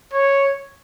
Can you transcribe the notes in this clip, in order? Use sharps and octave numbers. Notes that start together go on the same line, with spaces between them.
C#5